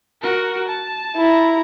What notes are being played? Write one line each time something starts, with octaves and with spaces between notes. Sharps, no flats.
F#4 A#4
A5
E4 A#5